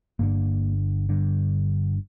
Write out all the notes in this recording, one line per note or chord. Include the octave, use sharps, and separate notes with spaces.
G1 G2 D3 A#3
G1 G2 D3